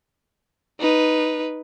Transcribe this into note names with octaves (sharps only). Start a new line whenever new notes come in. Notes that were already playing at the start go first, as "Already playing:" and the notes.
D#4 B4